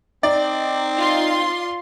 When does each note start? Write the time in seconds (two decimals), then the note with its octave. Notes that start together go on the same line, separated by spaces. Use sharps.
0.23 C4 D#4 D5
0.97 F4 C6